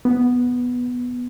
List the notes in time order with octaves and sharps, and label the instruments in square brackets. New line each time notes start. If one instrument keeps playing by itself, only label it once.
[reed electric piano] B3